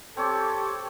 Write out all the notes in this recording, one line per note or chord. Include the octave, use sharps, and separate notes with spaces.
C4 G4 A4 C#5 G5 D6